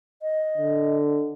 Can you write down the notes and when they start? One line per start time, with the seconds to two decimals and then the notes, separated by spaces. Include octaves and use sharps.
0.22 D#5
0.57 D3